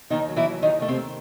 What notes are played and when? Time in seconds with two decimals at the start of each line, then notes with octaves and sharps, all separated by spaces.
0.10 D#2 D#3 D#4
0.29 F#3
0.36 E3 E4
0.46 D#2
0.62 D#2 D#3 D#4
0.80 D#3 A3
0.88 C3 C4
0.96 D#3